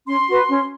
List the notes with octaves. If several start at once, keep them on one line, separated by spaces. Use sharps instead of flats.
C#4 C6
F#4 B4
C#4